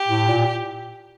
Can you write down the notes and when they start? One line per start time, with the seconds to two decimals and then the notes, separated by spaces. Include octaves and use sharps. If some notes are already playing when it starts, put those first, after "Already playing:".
Already playing: G4
0.08 A2
0.28 A#2